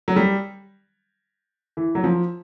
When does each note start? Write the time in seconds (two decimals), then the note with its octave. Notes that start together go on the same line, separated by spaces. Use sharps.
0.08 F#3
0.16 G3
1.77 E3
1.95 F#3
2.04 F3